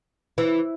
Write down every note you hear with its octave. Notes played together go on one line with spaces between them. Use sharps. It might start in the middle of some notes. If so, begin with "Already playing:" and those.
E3